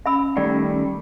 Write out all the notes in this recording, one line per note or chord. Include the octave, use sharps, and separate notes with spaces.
C#4 E5 B5 E6
D#3 G3 A3 D5